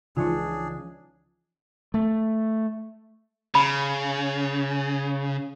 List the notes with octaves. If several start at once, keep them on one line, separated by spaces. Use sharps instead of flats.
C#2 C#3 E3 F3 D4 D#4 F4 G#4
A3
C#3 B5